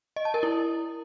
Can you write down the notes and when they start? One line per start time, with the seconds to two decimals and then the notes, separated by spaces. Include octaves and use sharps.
0.16 D#5
0.25 A5
0.34 A#4
0.43 E4